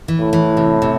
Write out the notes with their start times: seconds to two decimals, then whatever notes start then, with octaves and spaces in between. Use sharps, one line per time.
0.08 E3
0.20 A2
0.33 E3
0.57 C3
0.82 C3